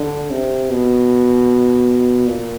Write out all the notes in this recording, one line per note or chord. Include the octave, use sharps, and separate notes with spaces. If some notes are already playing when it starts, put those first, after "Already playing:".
Already playing: D3
C3
B2
A#2